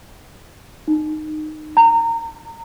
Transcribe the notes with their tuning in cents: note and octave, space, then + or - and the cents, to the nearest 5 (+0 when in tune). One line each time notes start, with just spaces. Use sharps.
D#4 -20
A#5 -25